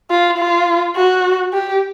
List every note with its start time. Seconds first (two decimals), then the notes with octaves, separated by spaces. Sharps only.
0.11 F4
0.38 F4
0.96 F#4
1.53 G4